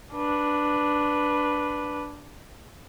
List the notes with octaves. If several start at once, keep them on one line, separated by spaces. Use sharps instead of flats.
D4 B4